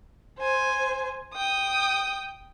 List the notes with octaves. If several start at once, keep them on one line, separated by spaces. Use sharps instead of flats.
C5 G#5
G5 D#6